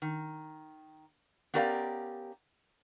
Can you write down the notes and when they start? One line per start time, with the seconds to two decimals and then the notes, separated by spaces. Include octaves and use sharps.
0.02 D#3
1.54 B3 C#4 G4 A#4 D5 F5